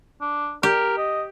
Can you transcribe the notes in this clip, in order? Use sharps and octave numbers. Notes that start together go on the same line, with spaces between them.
D4
G4 A#4
D#5